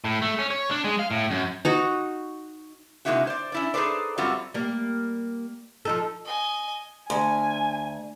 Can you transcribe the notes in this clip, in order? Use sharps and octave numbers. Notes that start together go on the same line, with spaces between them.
A2
A3
C#4
C#5
D4
G#3
F5
A2
F#2
D#4 F#4 D#5
C3 G#3 A#3 D#4 E4 F#4
C5 D5
C#4 E4 D5
D#4 G#4 A4 B4 C5 D5
F#2 G3 C4 F4 F#4
G3 A#3
F3 D#4 A4
D#5 G#5
D2 G#5